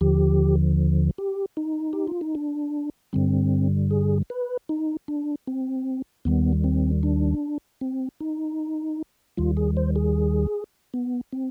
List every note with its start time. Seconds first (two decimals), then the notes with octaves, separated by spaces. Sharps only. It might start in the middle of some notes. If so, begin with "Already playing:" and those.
0.01 D#2 D3 F3 G4
1.18 G4
1.57 D#4
1.93 G4
2.07 F4
2.21 D#4
2.35 D4
3.13 G2 D3 G3 C4
3.91 G#4
4.30 B4
4.69 D#4
5.08 D4
5.47 C4
6.25 D#2 D#3 G3 B3
6.64 C4
7.03 D4
7.81 C4
8.20 D#4
9.37 D#2 D#3 G3 F4
9.57 G#4
9.77 C5
9.96 G#4
10.94 B3
11.32 C4